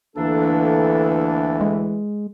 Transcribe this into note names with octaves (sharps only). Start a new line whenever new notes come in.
D2 E3 A#3 D4 A4
G#3